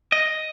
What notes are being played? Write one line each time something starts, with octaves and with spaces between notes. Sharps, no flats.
D#5